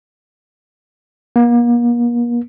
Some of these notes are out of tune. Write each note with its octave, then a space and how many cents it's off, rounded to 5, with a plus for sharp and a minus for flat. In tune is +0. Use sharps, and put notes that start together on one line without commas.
A#3 +40